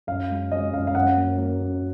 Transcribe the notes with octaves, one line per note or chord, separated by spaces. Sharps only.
F#2 F5
G#3
G#3 D#5
F#2 F5
F5
F#2 F#5
A#3
A#3
F#2